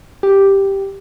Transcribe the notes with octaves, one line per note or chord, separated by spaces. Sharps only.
G4